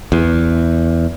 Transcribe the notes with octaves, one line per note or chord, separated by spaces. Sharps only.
E2